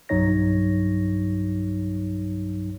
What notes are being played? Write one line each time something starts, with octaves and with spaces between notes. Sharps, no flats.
B1 G2 F#3 D#4 C#5 A#6